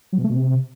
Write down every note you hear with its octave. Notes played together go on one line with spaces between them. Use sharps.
F#3
B2
A3
B2
C3